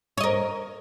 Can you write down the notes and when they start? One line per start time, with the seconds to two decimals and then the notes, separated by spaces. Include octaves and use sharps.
0.17 C#5
0.20 D#5
0.23 A#4